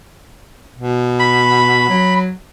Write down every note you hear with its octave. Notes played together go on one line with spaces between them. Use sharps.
B2
B5
F#3